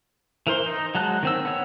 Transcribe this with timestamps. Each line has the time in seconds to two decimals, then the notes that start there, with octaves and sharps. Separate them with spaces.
0.47 E3 A#4 C5 C6
0.66 D#4
0.95 F#3 G#3 A5 F#6
1.23 D#3 C4 E6
1.45 B3 C#5